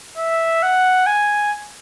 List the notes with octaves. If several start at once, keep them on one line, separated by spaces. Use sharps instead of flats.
E5
F#5
G#5